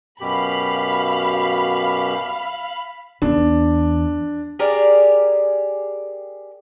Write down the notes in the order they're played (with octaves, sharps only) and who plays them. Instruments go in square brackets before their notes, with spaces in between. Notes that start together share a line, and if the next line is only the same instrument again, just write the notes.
[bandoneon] F#2 B2 G4 [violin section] F5 B5
[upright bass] E2 [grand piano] D4
[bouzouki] G4 G#4 A#4 D5